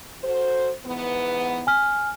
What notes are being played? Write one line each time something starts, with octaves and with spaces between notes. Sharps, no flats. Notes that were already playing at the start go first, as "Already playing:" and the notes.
F#4 A4 C5
G#2 E3 B3
G#5 F6